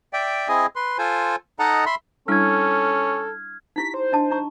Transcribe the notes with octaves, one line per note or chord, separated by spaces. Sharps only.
D5 E5 G5
C4 E4 G#4 D#5 G#5
B4 C6
F4 A4 C5 G#5
D#4 A4 D#5 F#5 A5 A#5
E5 B5 C6
G3 C#4 D4 E4 A4 F6 G#6
D#4 E4 G4 B6
C5
D4 D#5 A5
D#4 A#5 C#6